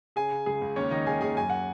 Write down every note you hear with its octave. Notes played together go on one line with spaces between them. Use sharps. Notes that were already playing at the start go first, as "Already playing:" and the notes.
C#3 G#4 G#5
C#3
C#2 G#4
C#2
D#2 C#4 C#5
D#3 D#4 D#5
D#3 G#4 G#5
D#2 G#4 G#5
F#2 G#5
F#5